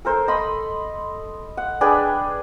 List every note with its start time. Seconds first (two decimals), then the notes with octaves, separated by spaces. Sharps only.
0.05 A4 A#4 C5
0.28 D#5 B5 C6
1.57 F#5
1.81 D4 G#4 B4 G5